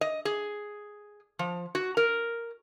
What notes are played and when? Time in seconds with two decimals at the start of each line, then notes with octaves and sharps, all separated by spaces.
0.01 D#5
0.25 G#4
1.39 F3
1.75 F#4
1.97 A#4